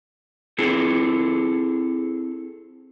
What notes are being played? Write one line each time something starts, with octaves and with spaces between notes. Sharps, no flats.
C4 E4 G#4 A4